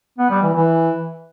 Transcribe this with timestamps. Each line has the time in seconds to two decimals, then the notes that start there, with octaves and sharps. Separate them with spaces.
0.19 B3
0.31 G3
0.42 E3
0.54 E3